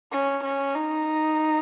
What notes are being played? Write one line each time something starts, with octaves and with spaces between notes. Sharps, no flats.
C#4
C#4
D#4